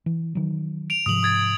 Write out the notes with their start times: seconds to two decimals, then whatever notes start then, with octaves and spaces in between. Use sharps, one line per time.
0.06 E3
0.35 D#3 F#3
0.90 D7 F7
1.06 G#2 C3 F3 D#6 F#7
1.23 D#6 G#6 A6